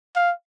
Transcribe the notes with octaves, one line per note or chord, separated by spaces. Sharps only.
F5